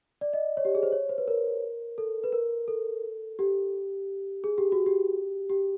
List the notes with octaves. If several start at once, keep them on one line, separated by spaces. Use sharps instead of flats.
D5
D#5
C#5
G4
G#4
C5
C#5
C5
B4
A#4
A4
B4
A#4
A4
G4
G#4
G4
F#4
G4
G4